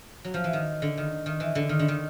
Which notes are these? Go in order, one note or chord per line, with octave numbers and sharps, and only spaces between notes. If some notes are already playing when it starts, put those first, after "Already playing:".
F#3
F3
E3
D#3
D3
D#3
D#3
E3
D3
D#3
D3
D#3